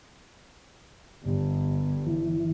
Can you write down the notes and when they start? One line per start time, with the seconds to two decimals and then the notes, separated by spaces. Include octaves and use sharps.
1.23 G1
2.07 E3